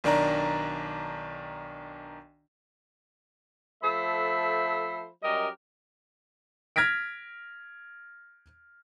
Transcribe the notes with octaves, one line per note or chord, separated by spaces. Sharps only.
B1 D#3 D4 D5 A#5
F3 A3 A4 C5 E5 B5
F#2 G3 G4 A#4 D#5
F6 G#6 A#6 B6 D7